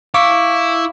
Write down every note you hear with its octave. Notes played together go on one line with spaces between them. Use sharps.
E4 F5 C#6 D6